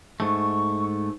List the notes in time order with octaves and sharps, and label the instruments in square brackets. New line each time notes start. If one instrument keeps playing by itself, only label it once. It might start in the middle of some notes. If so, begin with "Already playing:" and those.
[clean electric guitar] G#2 A3 [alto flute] C#6